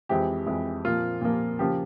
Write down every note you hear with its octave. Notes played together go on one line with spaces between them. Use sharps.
F2 E3 G#3 C4 G4
F2 E3 G#3 C4
A#2 F3 A#3 F4
A#2 F3 A#3
C#3 F3 A#3 G4